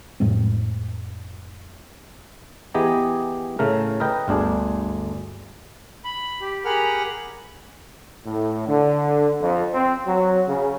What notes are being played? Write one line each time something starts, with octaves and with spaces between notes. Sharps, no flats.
F2 A2 G#3 C4
E3 B3 G4 G#4 D#5 A#5
A2 C#3 A3 A#4
A#4 B4 D#5 G5
G1 D2 D4 G#4
B5
G4
G4 G#4 A#4 F#5 B5 F6
A2
D3
F2
C4
F#3
C#3